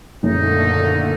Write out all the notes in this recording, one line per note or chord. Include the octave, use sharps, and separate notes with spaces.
F#1 A#2 D3 A3 D#4